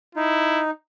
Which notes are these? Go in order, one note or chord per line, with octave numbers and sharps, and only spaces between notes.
D#4 E4